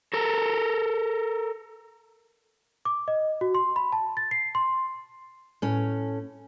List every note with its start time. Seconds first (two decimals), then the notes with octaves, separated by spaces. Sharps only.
0.13 A4 A#4
2.85 D6
3.08 D#5
3.41 F#4
3.55 C6
3.76 B5
3.92 A5
4.17 A6
4.31 C7
4.55 C6
5.62 A2 C#4